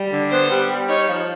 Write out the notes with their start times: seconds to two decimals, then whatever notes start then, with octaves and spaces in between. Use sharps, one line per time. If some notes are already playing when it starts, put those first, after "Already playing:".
Already playing: G3
0.12 D3
0.31 B3 C5
0.51 G3
0.70 G3
0.89 D#4 C#5
1.08 F3